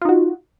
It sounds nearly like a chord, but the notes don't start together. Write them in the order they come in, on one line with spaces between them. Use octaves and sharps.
F4 D#4 F#4